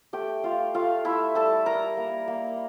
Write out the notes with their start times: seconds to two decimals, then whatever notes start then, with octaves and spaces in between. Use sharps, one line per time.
0.13 A3 G4 G5
0.44 A3 F4 F5
0.74 A3 F4 F5
1.05 A3 E4 E5
1.35 G3 A4 A5
1.66 G3 A#4 A#5
1.97 A#3
2.28 A#3